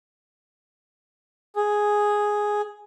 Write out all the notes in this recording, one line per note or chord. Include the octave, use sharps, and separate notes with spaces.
G#4